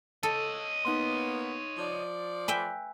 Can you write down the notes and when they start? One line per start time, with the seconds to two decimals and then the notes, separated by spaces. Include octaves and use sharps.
0.23 A4 C#5 D#5
0.85 A#3 B3 D#4 C6
1.77 F3 D5
2.48 B4 E5 G5 G#5